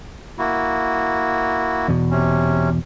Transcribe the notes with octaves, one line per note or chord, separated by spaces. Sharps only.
A#3 E4 F#4
E2 B2
C3 C#4